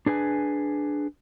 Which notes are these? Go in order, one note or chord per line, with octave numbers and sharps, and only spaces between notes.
D4 G#4 B4 G#5